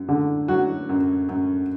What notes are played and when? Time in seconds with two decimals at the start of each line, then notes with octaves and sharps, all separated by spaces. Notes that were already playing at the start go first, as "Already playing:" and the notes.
Already playing: F#2
0.09 D3
0.48 F#3 F#4
0.89 F#2
1.29 F#2